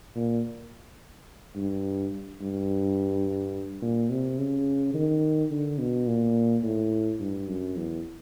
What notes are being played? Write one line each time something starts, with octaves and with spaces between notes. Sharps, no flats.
A#2
G2
G2
A#2
C3
C#3
D#3
D3
B2
A#2
A2
G2
F#2
E2